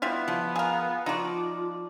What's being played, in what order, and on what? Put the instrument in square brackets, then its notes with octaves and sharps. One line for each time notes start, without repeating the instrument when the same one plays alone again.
[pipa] G3 E4 F4 [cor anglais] B3
[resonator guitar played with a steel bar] F3 [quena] F5
[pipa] G#4 A#4 [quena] F5
[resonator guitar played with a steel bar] F3 D5 [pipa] D#4 F#4 [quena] F4